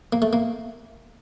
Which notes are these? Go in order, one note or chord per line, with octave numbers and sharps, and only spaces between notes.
A#3
A3
A#3